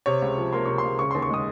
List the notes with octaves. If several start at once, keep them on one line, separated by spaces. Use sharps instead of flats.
C3 C#5
C#2
F3
A#3 C6
C3 C#6
C6
C#2
C#3 C#6
D#2 C6
C#6
G#3 D#6